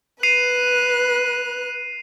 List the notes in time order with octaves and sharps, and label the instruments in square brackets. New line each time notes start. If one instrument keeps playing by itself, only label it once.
[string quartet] B4 F#6 [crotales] C7 D#7 F7